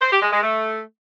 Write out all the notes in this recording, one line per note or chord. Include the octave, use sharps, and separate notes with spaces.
C5
G4
G#3
G#3
A3